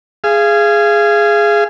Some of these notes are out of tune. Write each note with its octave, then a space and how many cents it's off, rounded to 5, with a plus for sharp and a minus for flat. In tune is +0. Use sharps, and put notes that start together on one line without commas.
G#4 +0 F5 -30